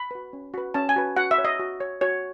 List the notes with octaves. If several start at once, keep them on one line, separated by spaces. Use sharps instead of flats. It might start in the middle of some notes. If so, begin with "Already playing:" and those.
Already playing: B5
F#4 B4
C#4
F#4 B4
C#4 A5
G#5
F#4 B4
F#4 F#5
E5
C#5
D#5
F#4
C#5
F#4 C#5